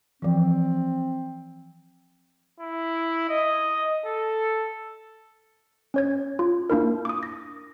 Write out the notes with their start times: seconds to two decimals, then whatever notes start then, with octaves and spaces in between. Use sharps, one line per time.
0.22 E3 F3 C4
2.60 E4
3.30 D#5
4.06 A4
5.94 C#4 C#5 G#6
6.39 F4
6.70 A#3 D4 E4 A#4
7.05 D6 D#6
7.23 A#6